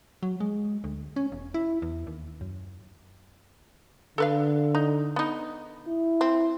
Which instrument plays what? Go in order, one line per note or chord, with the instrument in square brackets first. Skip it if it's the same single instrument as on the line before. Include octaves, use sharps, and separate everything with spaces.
[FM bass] F#3
G#3
D2
C#4
E1
E4
E2
D#2
F#2
[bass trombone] D3 [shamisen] A4 B4 F5
[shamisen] D#4
B3 D#4
[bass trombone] E4
[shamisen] C4